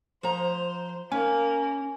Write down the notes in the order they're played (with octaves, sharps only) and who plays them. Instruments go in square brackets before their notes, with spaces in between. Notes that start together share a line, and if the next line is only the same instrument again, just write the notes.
[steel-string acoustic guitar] F3 A#5 [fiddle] C5
[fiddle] A#3 [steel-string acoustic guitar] C#4 [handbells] G#5